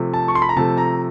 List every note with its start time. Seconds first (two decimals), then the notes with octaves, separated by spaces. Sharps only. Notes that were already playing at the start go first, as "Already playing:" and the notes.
Already playing: C3 F3 A3
0.14 A5
0.28 C#6
0.35 C6
0.42 B5
0.49 A#5
0.56 C3 F3 A3 A5
0.77 A#5